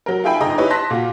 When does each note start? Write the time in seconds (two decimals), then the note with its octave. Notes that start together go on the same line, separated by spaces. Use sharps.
0.06 F#3 A#4
0.24 F4 G#4 E5 G5 G#5 B5
0.40 G1 G#2 G#4 D#5 A#5
0.58 E4 G4 B4 C#5 D#5
0.70 A5 C6 F#6 A#6 B6
0.91 A#2 F4 F#4